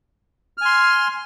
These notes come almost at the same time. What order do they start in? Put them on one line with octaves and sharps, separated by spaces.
F6 G#5 C6